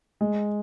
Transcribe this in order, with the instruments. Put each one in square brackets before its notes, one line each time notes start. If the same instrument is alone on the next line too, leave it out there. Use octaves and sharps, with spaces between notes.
[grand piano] G#3